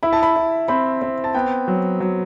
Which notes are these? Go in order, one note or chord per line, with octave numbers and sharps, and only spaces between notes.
E4 B5
A5
B5
E4
C4 B5
C4
A5
B3 G5
F#3
F#3